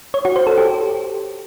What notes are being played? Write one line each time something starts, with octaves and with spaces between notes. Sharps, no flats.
C#5
F#4
C5
A4
G4